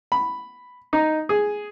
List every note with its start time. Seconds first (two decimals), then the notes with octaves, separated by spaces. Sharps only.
0.12 B5
0.93 D#4
1.29 G#4